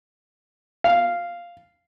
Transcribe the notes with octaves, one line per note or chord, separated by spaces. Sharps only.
F5